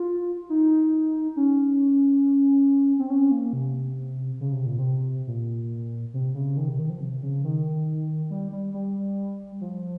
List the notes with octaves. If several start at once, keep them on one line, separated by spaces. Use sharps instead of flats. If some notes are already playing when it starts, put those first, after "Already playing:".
Already playing: F4
D#4
C#4
C4
C#4
A#3
C3
C#3
C3
A#2
C3
A#2
C3
C#3
D#3
C3
D#3
F3
C3
C#3
D#3
G3
G3
G3
F3